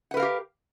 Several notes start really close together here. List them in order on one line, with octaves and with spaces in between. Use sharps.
F#5 B4 A#4 F5 G4